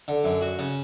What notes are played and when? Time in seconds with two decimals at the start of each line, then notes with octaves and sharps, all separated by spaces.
0.08 D3
0.24 F#2
0.41 F#4
0.59 C#3